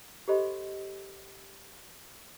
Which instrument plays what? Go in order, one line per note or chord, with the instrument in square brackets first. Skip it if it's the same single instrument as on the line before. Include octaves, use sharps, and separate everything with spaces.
[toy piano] G4 A4 C5 D#5 B5 C6